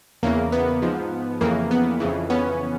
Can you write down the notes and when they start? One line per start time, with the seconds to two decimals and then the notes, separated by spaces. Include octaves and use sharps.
0.23 E2 C#3 E3 A#3
0.52 B3
0.82 G#2 F3
1.41 F2 C#3 E3 A#3
1.71 B3
2.00 F2 C#3 E3
2.30 B3 C#4